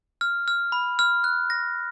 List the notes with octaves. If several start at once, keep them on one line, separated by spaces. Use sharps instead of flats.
F6
F6
B5
F6
F#6
A#6